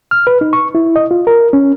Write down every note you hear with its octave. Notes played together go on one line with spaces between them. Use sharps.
F6
B4
D#4
C#6
E4
D#5
F4
A#4
C#4